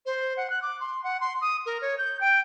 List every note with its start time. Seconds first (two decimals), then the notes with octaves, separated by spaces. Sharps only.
0.06 C5
0.37 F#5
0.50 F#6
0.63 D6
0.80 C6
1.04 F#5
1.21 C6
1.41 D#6
1.66 A#4
1.82 C#5
1.98 G6
2.21 G5